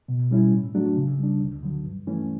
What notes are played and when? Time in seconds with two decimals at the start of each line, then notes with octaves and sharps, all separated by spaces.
0.08 B2
0.31 G3 C#4 E4
0.52 A2
0.74 F#3 A3 D4 F#4
0.96 C#3
1.19 G3 D4
1.41 D2
1.63 D3 F#3
1.85 G2
2.07 E3 A3 C#4